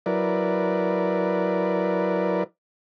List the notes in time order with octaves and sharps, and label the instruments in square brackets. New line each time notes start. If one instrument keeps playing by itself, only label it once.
[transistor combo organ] F#3 E4 A#4 B4 D5